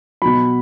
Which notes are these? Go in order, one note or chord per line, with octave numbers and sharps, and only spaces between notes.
B2 F#3 B5